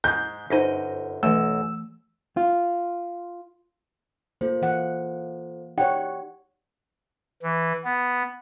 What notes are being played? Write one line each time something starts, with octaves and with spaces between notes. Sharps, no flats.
G#2 G#3 G6
G1 F#2 D#4 C5 D#5 A#6
B1 F#2 E3 A3 E6
F4
A#3 F4 A4 C5
E3 F#5
D#4 G4 C#5 D5 F#5 G5
E3
B3